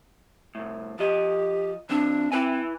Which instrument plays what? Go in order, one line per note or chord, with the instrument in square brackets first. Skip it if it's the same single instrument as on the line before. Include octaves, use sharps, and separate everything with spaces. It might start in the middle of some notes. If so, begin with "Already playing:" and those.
[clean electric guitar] C2 A2
[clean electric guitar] F3 D#5 [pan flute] G4
[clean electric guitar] E3 C4 [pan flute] D4
[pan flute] C4 [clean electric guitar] E4 B4 G#5